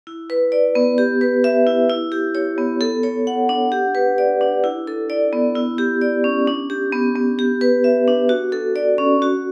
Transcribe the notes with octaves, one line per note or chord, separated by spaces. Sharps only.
E4
B4
D5
B3
G4
B4
E5
E4
E4
G4
C#5
B3
A4
C#5
F#5
D4
G4
B4
D5
D4
E4
A4
D5
B3
E4
G4
D5
C#4
D4
G4
B3
B3
G4
B4
E5
D4
F#4
A4
D5
C#4
F#4